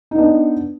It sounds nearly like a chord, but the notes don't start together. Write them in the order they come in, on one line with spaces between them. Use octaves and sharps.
D#4 B3 D4